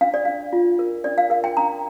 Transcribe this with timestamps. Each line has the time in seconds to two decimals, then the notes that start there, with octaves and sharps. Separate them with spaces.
0.01 D4 F5
0.14 D5
0.25 D4 F5
0.53 F4
0.79 A#4
1.04 D4 D5
1.18 F5
1.30 A#4 F5
1.44 G5
1.57 D4 A#5